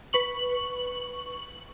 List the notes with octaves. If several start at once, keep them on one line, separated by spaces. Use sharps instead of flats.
B4 C#6 F#7